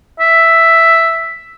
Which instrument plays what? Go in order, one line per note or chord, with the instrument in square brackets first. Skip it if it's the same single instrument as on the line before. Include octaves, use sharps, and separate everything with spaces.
[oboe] E5